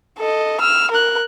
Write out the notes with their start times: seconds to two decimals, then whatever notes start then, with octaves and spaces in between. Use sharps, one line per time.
0.19 A4 D#5
0.60 E6 F6
0.91 A#4 F#6